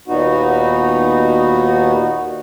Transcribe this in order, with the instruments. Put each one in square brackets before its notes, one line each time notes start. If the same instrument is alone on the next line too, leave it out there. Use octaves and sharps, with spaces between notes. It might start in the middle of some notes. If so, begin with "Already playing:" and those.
[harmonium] D#2 A#2 B3 D#4 F#4